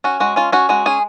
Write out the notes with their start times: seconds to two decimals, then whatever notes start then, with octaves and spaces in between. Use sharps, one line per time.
0.04 C#4 F#4
0.20 G#3 F#4
0.36 C#4 F4
0.52 C#4 F#4
0.69 G#3 F#4
0.86 C#4 G#4